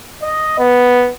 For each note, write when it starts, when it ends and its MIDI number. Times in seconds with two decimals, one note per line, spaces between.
0.22 0.56 75
0.58 1.10 59